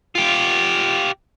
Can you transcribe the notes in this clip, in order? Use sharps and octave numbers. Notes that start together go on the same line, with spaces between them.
F4 G4